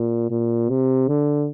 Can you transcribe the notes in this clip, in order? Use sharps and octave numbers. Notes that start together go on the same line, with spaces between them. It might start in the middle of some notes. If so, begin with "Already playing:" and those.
Already playing: A#2
A#2
C3
D3